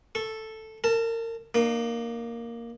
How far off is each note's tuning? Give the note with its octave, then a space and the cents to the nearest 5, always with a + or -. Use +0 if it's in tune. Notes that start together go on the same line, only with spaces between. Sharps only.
A4 +0 C#6 -25
A#4 -30 A5 +5
A#3 +0 D#4 -45